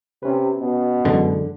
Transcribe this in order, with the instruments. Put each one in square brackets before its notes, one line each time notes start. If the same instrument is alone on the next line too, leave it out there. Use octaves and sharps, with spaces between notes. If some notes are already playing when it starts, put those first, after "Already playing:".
[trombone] C3 [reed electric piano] C#4 B4
[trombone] B2
[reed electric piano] F#2 E3 G#3 [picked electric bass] D3